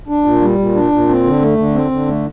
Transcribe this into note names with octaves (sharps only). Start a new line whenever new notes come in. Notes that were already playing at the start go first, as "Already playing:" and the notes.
D4
A#2
G3
A#2
D4
A#2
C4
D3
A3
D3
C4
D3
A3